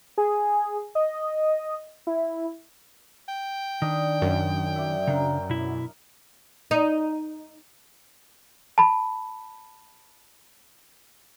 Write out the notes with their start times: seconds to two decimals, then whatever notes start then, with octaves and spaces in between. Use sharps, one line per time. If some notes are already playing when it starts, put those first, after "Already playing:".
0.18 G#4
0.95 D#5
2.07 E4
3.28 G5
3.82 D#3 D4 D#5
4.22 F#2
4.76 D5 E5
5.07 C#3 D4 A#4
5.50 B2 E4
6.71 D#4
8.78 A5 B5